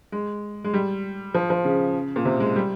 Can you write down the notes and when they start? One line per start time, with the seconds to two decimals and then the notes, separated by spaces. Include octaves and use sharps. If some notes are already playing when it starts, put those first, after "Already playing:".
0.12 G#3
0.64 G#3
0.73 G3
1.34 F3
1.50 F3
1.64 C#3
2.16 A#2
2.25 C3
2.40 G#3
2.56 G3